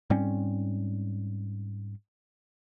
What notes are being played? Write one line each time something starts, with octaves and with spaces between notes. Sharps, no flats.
G#2 G3 C4 C#4